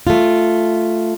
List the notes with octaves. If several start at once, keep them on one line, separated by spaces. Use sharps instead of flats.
A3 F4